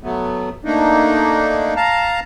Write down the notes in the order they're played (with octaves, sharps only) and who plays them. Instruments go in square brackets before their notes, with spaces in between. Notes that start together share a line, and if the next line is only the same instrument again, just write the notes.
[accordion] F#3 A3 B3
A3 A#3 D4 D#4
F5 A5 A#5